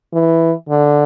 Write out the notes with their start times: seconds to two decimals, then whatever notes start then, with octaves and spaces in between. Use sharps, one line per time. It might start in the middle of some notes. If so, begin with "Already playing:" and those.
0.13 E3
0.69 D3